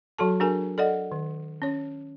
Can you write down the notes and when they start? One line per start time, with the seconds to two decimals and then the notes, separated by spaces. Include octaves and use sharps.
0.18 F#3 F#4 A4 A5
0.40 D4 F#4 G#4 A#4 G#5
0.78 A4 D5 D#5 F#5
1.12 D#3
1.62 C#4 C#5